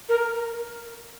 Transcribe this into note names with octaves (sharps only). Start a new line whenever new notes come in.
A#4